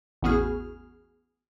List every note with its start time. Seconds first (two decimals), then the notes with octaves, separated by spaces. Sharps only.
0.22 A1 E2 B3 F#4 G#4 F6